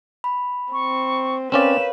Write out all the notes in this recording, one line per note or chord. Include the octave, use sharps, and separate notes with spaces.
B5
C4 C#6
C4 C#4 A#4 B4 C#5 D5 F5 E7